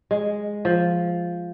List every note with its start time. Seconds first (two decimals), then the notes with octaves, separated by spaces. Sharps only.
0.11 G#3
0.65 F3